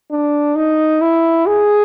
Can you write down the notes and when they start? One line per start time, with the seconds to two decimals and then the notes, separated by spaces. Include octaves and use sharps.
0.11 D4
0.56 D#4
1.02 E4
1.47 G#4